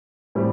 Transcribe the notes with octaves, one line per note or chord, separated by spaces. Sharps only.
A2 E3 G3 C4